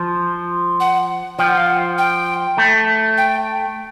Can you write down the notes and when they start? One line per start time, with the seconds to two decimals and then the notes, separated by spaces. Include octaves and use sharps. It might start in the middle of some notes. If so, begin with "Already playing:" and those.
Already playing: F3
0.80 F#5
1.39 F3 G5
1.49 F#5
1.57 F5
1.66 F#5
1.98 G5
2.58 A3
3.18 G5